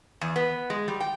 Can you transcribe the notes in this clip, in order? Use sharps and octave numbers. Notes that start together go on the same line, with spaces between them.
E2
B3
G#3
G3
G5